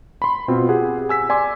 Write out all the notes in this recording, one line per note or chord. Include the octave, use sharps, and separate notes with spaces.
B5 C6
B2 C4 F4
G4 G#4 F#5
G#5 E6 B6
D5 G#5 C6 D6